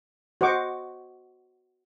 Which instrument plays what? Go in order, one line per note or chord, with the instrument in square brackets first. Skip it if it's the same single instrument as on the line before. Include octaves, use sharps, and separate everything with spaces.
[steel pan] F#4 C5 D#5 C#6 D6